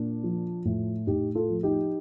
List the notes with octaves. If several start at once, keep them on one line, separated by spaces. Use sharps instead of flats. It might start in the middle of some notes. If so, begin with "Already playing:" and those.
Already playing: A#2 D4
F3
A2
A2 D#4 G4
F4 A4
F3
D#4 G4